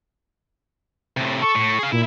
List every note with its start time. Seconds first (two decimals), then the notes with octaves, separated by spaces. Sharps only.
1.17 A2 C3
1.42 A4 C#6
1.55 A2
1.79 G#4 F5
1.92 A#2 E4